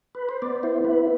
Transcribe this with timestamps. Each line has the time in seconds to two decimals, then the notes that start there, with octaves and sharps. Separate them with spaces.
0.15 B4
0.29 C5
0.42 B3 D5
0.63 E4 C5
0.84 B3 B4